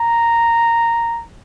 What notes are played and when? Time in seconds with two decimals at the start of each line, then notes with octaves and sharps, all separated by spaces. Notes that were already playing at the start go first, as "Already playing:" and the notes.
Already playing: A#5